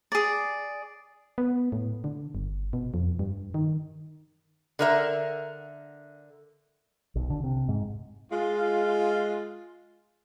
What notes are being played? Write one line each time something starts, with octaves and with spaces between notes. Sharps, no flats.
G#4 D5
B3
A2
D3
G1
B2
F2
G2
D#3
D3 A#4 E5
B1
D3
C3
G#2
G#3 F4